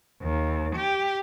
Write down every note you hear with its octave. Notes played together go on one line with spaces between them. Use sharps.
D#2
G4